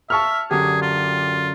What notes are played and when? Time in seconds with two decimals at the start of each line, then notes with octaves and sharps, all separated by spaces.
0.10 E5 A5 C#6 F6
0.51 F#2 D3 G4 G#4
0.82 F4